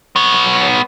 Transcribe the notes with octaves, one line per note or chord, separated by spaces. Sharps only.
B3 C#5